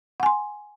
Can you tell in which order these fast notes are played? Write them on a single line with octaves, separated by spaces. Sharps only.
F#5 G#5 C6